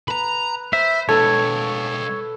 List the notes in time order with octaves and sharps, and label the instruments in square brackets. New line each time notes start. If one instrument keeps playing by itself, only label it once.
[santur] B4 [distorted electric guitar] A#5 B5
[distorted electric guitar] C5 [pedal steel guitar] E5
[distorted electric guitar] G#3 D4 [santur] A4 B4 [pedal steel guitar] C#5